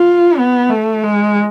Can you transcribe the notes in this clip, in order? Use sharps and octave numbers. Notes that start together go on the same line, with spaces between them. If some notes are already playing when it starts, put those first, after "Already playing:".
Already playing: F4
B3
A3
G#3